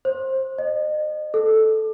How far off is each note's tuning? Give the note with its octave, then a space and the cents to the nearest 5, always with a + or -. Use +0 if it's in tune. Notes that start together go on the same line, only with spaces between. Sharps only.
C5 +20
D#5 -35
A4 -5